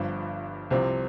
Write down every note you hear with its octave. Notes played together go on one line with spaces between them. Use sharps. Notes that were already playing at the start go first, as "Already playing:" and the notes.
Already playing: G1 G2 F3
C2 C3 F3 C4